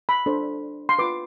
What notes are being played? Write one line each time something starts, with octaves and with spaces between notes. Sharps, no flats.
B5
D4 A4 C5
C6
F4 B4 D6